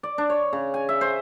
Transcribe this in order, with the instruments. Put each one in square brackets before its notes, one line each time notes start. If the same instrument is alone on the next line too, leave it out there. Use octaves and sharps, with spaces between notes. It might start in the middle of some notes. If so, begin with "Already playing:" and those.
[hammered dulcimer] D5
D4
C#5
C#3
G#5
E5
C5